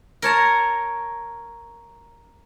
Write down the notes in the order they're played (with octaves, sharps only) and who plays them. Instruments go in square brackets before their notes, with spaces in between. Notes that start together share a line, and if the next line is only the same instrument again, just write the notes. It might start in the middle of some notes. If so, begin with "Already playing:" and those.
[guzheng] A#4 C#5 A5 A#5